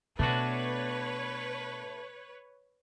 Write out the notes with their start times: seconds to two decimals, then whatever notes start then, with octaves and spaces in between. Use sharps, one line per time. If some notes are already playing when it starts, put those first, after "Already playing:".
0.19 B2 A3 D4 F#4 B4 C#5